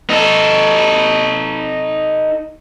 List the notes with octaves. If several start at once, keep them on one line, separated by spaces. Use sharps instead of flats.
D#4 A4